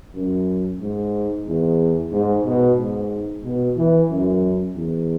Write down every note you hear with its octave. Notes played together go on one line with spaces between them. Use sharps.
F#2
G#2
E2
G#2
B2
G#2
B2
E3
F#2
E2